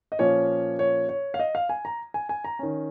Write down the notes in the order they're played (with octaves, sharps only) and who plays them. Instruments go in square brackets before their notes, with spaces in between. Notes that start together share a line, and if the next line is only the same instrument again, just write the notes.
[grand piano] D#5
A#2 F3 A#3 C#4 C#5
C#5
C#5
F5
D#5
F5
G#5
A#5
G#5
G#5
A#5
D#3 C#4